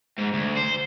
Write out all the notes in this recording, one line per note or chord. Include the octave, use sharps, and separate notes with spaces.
G#2
D2
C5